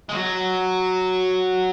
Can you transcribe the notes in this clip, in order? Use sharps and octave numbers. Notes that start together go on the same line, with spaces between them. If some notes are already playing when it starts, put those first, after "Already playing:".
G#3
F#3